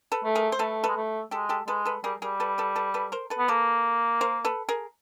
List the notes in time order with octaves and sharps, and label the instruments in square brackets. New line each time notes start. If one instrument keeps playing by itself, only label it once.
[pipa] A4 B4
[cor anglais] A3
[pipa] G#4 A#4
C5
[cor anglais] A3 [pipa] A4 B4
[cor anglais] G#3 [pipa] A4 B4
[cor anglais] A3
[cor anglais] G#3 [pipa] G4 A4
[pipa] G4 A4
[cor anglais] G#3 [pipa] A4 B4
[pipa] A4 B4
[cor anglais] G3 [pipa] G#4 A#4
[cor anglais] G3 [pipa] G#4 A#4
[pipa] A4 B4
A4 B4
A4 B4
A4 B4
A#4 C5
A4 B4
[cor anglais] B3
[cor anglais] A#3 [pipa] A4 B4
[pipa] A#4 C5
A4 B4
G#4 A#4